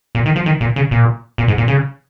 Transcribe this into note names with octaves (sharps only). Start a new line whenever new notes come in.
A#2
D#3
F3
D#3
A#2
C#3
A#2
A#2
G#2
A#2
C#3